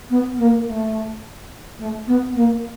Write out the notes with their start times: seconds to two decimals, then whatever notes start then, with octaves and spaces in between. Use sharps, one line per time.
0.10 B3
0.38 A#3
0.66 A3
1.79 A3
2.07 B3
2.35 A#3